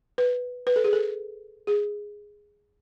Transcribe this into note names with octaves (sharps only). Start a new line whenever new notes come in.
B4
B4
A4
G#4
A4
G#4